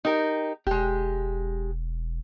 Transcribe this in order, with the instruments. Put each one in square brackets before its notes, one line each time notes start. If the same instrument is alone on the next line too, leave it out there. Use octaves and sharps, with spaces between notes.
[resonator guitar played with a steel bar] D#4 G4 A#4
[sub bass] E1 [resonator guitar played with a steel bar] G#3 G4